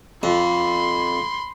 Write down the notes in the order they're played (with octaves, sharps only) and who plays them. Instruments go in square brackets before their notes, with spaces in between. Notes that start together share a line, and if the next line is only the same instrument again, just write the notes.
[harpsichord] F2 [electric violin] B5 C6